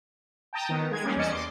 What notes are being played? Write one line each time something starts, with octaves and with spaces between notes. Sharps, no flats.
G5 A5 A#5 D#6
D#3 B3
G#3 G#6
G3 A#3 C#4 G#4
E2 C#4 D5 D#5 C#7 E7
C6 D6